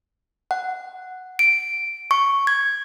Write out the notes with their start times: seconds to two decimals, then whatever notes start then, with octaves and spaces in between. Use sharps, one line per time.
0.51 F#5
1.39 D7
2.11 C#6
2.47 G#6